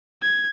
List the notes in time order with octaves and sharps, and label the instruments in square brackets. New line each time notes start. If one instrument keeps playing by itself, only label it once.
[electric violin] G#6